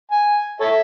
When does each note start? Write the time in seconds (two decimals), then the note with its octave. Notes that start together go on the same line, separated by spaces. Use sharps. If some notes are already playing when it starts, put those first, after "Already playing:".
0.11 G#5
0.61 A4 C#5 E5